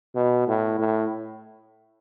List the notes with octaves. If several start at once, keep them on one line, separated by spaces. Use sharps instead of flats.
B2
A2
A2